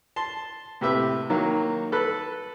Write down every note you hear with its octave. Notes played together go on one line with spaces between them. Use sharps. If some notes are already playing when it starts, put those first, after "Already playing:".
A5 C6
A2 C3 B4 E5
D#3 F#3 A#3
A4 B4 F#6